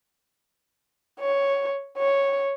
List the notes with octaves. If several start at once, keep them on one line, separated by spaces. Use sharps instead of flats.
C#5
C#5